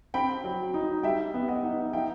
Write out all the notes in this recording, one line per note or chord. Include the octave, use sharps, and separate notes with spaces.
C4 G5 B5
F#3
D#4
G3 E5 G5
B3
D#5 F#5
D#4
D#4 E5 G5